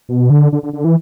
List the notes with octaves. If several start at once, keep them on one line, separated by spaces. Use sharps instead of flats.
B2
D3
D3
D3
D3
E3